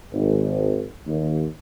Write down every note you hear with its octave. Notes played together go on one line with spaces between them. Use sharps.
G#1
D#2